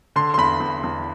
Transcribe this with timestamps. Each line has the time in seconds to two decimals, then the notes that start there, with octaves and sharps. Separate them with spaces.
0.16 D3 C6
0.34 C6
0.38 E2 B5
0.60 E2
0.84 E2